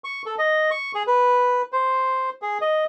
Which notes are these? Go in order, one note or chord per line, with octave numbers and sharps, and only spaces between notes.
C#6
A4
D#5
C#6
G#4
B4
C5
G#4
D#5